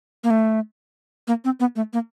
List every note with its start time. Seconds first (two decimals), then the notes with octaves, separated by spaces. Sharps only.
0.24 A#3
0.30 A3
1.28 A#3
1.45 C4
1.60 B3
1.76 A3
1.93 A#3